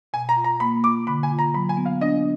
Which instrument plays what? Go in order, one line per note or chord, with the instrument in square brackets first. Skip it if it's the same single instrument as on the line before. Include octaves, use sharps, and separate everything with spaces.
[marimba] B2 [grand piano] G#5
[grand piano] A#5
[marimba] F4
[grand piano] A#5
[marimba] A#3 [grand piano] B5
[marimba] F4 [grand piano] D6
[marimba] D3 [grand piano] B5
[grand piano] G#5
[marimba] F4
[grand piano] A#5
[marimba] F#3 [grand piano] B5
[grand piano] G#5
[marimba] B3
[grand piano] F5
[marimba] D4 [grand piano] D#5